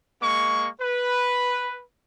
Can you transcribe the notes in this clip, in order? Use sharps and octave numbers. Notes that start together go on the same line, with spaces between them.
G#3 A#3 C#6
B4